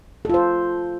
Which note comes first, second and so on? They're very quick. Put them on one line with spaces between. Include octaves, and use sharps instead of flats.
A4 F4 C5